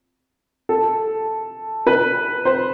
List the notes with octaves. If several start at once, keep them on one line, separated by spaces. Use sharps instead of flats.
A4
B4
C5